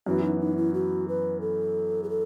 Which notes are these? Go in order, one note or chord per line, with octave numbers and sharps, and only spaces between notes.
F#2 E3 B3 F#4
D#4
D#4
E4
F#4
B4
A4
G#4
A4